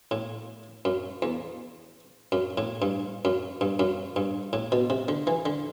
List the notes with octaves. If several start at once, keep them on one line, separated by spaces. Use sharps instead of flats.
A2
F#2
E2
F#2
A2
G2
F#2
G2
F#2
G2
A2
B2
C3
D3
E3
D3